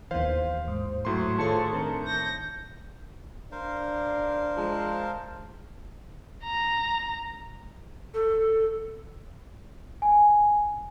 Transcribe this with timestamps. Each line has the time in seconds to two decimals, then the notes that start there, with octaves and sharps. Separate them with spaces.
0.11 D#2 E3 B3 C5 F5
0.68 G#2
1.05 A2 F#3 A3 C6
1.38 D#3 F4 G#4 A4 C5 C#5 A5 C#7
1.73 D#3 C4 D4 A#4
2.05 G6 A#6
3.52 D4 A#4 C5 F5
4.56 F3 G#3 A5
6.44 A#5
8.14 A4
10.02 G#5